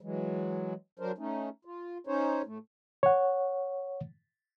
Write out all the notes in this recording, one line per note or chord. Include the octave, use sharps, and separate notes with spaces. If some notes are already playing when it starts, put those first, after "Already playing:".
E3 F#3 G#3
F#3 D4 A#4 C5
A3 C#4 D#4
F4
C#4 D#4 C5 C#5
A2 A3
C#5 F#5